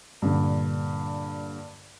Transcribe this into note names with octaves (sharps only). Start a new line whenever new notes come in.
G2 A#2 D3